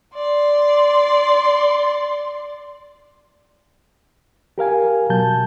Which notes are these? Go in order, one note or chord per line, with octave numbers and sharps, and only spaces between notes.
D5 C6
G4 A#4 F5 G#5
B2 F#3 A5 G6